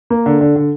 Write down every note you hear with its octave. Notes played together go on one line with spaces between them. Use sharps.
A#3
D3
D3
D3